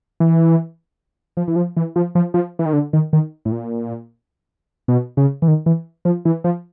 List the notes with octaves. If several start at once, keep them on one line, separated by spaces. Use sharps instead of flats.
E3
F3
E3
F3
E3
F3
F3
F3
E3
D#3
D3
D#3
D#3
A2
A#2
B2
C#3
E3
D#3
E3
F3
E3
F3